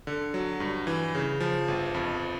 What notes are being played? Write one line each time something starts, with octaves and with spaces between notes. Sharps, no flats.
D3
F#3
G2
E3
C#3
F3
G1
F2